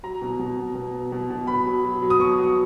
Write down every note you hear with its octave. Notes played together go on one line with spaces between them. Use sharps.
F#3 A#5
B2
B2
B2
B2
F#3
B2
B2
B2 B5
F#3
F#3
F#3
D#6
B2 C#6
F#3